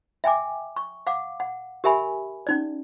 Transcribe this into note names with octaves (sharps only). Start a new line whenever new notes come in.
E5 G5 G#5 D6
C#6
F5 F#5 D6
F#5
G4 A#4 E5 G#5 B5
C#4 D#4 D5